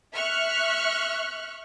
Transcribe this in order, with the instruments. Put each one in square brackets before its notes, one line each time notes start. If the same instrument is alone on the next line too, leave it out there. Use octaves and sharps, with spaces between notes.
[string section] E5 C#6 F6 F#6